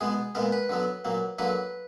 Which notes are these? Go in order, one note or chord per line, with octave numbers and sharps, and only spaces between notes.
B2 G#3 B3 G#4
A#2 G#3 B3 A#4
B4
D3 F#3 B3
A#2 F#3 A#3
D3 F#3 A#3 B4